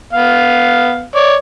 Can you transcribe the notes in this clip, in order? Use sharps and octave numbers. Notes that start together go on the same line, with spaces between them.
B3 F5
C#5 D5